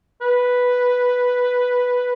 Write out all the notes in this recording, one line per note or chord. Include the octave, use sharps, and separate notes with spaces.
B4